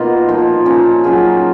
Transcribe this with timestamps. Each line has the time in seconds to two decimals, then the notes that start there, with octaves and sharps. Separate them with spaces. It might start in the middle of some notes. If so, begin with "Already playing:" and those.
Already playing: B2 A#3 D#4 F4
0.28 A#2 F3 A#3 D#4
0.65 A#2 F3 A#3 C#4
1.04 F#3 C#4 F4 G#4